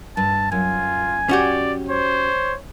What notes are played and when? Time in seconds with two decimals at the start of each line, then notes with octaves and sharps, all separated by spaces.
0.17 G2 A5
0.52 F#2 F4 G#5
1.29 C#4 F#4 G4 D5
1.89 C5 C#5